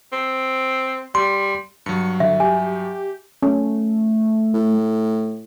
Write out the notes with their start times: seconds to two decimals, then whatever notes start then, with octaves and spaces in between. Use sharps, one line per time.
0.13 C4
1.15 G3 C6
1.86 G2 F#3 C#7
2.20 D3 E5
2.40 G4 G#5
3.43 A3 C#4
4.54 A2